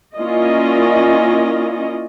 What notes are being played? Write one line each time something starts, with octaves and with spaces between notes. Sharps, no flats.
A#3 C#4 E4 F4 D5 D#5